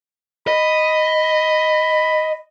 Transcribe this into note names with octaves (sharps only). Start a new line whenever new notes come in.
D#5 B5